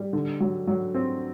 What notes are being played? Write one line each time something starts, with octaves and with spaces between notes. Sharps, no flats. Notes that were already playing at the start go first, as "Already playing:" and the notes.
Already playing: G3
D3
F#3
F#3
C4